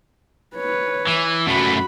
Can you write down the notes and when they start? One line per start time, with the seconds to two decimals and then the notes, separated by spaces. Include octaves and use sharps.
0.56 B4 C#5
1.08 E3
1.47 F#2 A3 F#4 B5